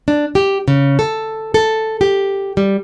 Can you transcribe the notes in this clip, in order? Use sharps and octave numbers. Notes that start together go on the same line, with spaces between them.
D4
G4
C#3
A4
A4
G4
G3